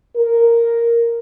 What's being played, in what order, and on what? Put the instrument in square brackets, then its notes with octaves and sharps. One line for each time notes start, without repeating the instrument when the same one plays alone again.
[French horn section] A#4